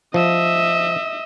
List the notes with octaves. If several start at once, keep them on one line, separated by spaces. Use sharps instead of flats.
F3 D#5 E5